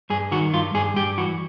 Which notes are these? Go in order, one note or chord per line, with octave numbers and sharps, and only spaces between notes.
G2 G#4
D#3 F#4
G2 F4
G2 G#4
G2 G4
E3 F#4